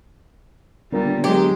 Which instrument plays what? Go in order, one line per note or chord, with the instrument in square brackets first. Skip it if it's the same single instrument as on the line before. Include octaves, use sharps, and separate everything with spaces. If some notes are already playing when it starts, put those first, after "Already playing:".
[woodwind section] A#2 [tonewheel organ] D3 B3 D4 [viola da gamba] G3
[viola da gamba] F#3 G#3 [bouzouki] G4